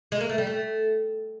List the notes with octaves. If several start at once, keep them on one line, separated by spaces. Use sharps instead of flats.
G#3
A#3
A3
G3
A3